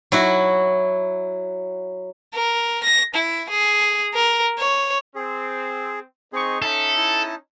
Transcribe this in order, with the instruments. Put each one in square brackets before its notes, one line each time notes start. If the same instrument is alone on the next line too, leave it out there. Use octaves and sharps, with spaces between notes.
[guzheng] F#3 E4 F#4
[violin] A#4
A#6
E4
G#4
A#4
C#5
[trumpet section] C4 [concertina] G#4
[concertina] C4 G#4 [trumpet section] D#4 D#5 C#6
[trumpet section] C#4 D#4 [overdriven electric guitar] A4 [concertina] E5
[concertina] E4 A5